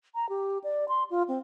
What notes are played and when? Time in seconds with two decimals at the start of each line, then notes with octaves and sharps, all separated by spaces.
0.15 A#5
0.29 G4
0.64 D5
0.89 C6
1.10 F4
1.28 C4